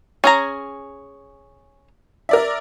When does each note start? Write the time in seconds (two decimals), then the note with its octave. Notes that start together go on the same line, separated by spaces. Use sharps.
0.24 C#4 G#4 A#5
2.29 A#4 D5 E5